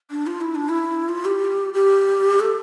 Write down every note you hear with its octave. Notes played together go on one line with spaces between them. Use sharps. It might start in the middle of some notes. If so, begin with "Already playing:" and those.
D4
F4
E4
D4
E4
F4
G4
G4
A4